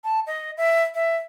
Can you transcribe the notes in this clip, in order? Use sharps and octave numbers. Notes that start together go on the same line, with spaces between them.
A5
D#5
E5
E5